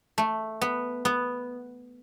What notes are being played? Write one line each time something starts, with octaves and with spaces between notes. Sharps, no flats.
A3
B3
B3